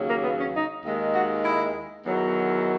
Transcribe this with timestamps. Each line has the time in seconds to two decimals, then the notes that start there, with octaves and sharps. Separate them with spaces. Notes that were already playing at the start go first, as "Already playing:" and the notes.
Already playing: D#2 C#3 F#3
0.09 A#3
0.23 B3
0.38 C#4
0.54 D#4
0.85 D#2 D#3 G#3
1.15 F#4
1.45 E4
2.06 E2 D#3 F#3